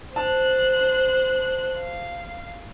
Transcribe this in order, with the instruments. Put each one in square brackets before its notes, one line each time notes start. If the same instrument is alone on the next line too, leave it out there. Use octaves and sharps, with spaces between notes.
[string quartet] C5 F#6 [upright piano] A5
[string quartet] F5